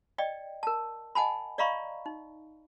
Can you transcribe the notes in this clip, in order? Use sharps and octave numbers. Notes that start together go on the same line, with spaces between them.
D5 D#5 G5
A#4 A5
D#5 F#5 G#5 A5 B5
D5 D#5 F5 A#5 B5 C#6
D#4